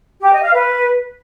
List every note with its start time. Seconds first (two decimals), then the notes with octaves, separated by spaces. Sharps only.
0.21 G4
0.32 D#5
0.43 F5
0.54 B4